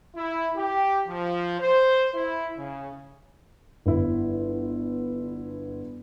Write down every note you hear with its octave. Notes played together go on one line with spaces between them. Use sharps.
E4
G4
F3
C5
E4
C#3
G1 E4